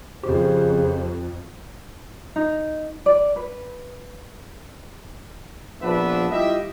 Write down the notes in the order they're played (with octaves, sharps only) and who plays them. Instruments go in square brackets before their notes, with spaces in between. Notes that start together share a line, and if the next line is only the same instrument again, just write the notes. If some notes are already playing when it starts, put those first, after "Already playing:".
[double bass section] F2 [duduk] C#3 [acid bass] G4 [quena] C5
[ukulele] D#4
D5
B4
[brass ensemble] A#1 F3 B3 D4 B4 E5
G3 E4 F4 G4 D#5 E5